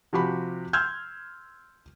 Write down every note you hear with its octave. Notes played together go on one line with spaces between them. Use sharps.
C3 F3 F#4 G4 B5
C6 E6 F6 G6 G#6